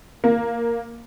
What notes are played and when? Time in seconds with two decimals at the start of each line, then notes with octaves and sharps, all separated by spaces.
0.24 A#3